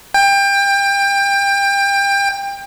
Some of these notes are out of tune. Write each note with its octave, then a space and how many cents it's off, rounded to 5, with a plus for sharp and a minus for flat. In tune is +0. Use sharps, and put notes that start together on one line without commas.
G5 +25